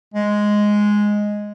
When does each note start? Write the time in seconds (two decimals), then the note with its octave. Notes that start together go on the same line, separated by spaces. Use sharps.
0.14 G#3